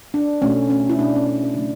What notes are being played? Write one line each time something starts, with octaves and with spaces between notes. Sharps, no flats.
D4
B2 A3 C#4
C#4
E4
B2 A3 D4
C#4
D4
C#4
C#3 F#3 A3 D4